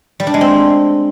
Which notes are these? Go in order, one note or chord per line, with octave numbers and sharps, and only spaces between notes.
G3
D4
G#3
C4